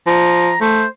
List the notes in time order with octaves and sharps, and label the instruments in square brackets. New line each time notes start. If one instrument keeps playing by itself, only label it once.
[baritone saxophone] F3 [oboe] A#5
[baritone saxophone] A3 [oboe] C5